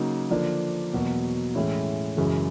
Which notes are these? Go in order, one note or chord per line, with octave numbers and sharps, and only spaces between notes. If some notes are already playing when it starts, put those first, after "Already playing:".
Already playing: C#3 F#3 A#3 D#4
D3 F3 A#3 D4
E2 B2 F#3 A#3
A2 E3 G#3 C#4 E4
F#2 C#3 E3 G#3